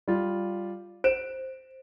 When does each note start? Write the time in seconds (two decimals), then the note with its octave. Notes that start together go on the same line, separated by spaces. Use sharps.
0.08 G3 F4
1.04 C5 D7 E7